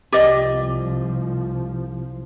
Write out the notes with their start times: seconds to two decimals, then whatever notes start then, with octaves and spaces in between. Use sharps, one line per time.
0.12 C2 F3 G4 D5 D#5